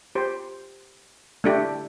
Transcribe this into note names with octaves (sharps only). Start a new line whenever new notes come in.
G4 C5
A3 D4 G4